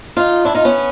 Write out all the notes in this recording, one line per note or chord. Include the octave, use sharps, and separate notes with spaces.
D#4 F4
D4 E4
D#4 F4
B3 C#4